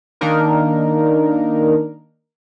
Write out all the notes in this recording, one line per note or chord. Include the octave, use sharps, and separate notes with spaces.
D#3 A#3 D4 D#4 A#4